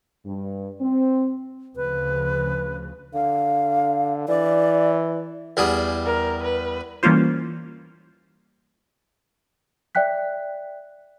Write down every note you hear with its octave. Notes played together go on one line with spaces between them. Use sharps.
G2
C4
D2 C#3 F3 B4
D3 F5
E3 D5
E2 G3 G#4
A#4
B4
E3 G3 A#3 C#4 F4 C5
D5 E5 G5 F#6 B6